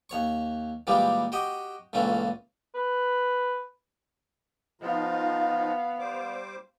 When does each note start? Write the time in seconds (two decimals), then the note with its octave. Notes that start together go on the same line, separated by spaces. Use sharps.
0.09 D#2 C#5 C#6
0.87 A#2 E3 G3 G#3 A#3 G4
1.32 F#4 G4 D#5 G5
1.93 C#2 A#2 E3 A3 C#4
2.75 B4
4.81 F3 B3 D#4 F4 F5
5.99 G3 C5 D6